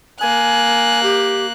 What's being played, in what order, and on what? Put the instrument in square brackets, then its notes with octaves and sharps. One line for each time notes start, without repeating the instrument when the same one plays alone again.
[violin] A#3 F#6 [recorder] G#5
[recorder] G4